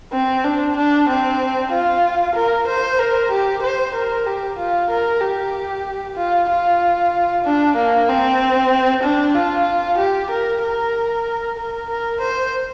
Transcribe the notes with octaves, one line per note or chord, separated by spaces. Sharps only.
C4
D4
D4
C4
F4
A#4
C5
A#4
G4
C5
A#4
G4
F4
A#4
G4
F4
F4
D4
A#3
C4
D4
F4
G4
A#4
A#4
A#4
A#4
C5